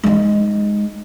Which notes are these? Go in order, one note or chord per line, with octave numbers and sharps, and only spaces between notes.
G#3 D#4